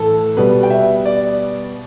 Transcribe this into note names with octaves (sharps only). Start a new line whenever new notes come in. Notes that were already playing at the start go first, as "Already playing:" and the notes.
Already playing: A2 E3 A4
B2 G3 B3 B4
G5
E5
D5